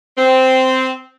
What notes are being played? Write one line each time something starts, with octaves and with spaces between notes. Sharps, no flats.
C4